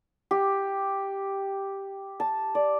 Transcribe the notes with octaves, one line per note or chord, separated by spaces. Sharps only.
G4
A5
D5